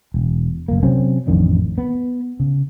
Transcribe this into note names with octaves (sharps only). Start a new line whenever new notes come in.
E1
F#1 A#3
C3 F#3 C4 C#4
A1 F2 D#3 D4
B3
C#3